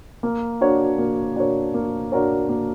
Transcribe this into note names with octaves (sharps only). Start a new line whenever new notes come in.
A#3
D4 F#4 A#4 C#5
A#3
D4 F#4 A#4 C#5
A#3
D4 F#4 A#4 C#5
A#3